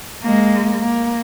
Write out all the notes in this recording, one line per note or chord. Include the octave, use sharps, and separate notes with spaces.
G#3 A#3
A#3